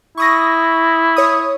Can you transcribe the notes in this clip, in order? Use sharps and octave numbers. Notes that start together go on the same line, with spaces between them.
E4 C#6 D#6 A#6
C#5 D#6